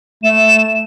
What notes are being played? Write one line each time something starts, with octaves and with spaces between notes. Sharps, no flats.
A3 E7